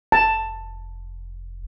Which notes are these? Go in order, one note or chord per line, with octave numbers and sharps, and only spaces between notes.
F1 A5